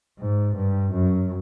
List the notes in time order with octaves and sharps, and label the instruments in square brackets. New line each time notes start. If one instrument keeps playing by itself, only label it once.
[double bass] G#2
G2
F#2